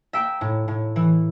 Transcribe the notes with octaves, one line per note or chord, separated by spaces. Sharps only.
A#3 E5 G5
A2
A2
E3